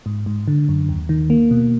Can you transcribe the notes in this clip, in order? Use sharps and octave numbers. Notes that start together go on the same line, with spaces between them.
G#2
G#2
D3
F#2
D#2
D#3
A#3
B2